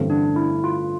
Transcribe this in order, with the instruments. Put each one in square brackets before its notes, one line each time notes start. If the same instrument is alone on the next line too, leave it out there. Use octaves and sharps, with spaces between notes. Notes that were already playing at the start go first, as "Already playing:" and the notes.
Already playing: [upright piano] A1 G2 D3 A3 C4
[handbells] D4
E4
F4